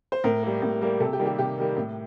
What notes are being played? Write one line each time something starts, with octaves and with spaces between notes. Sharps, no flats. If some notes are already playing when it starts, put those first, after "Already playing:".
C5
A2 A#4
G3 A#3
A2
G3 A#3
C3 A4
G4
D#3 G3 A#3
G4
C3 G4
D#3 G3 A#3
A2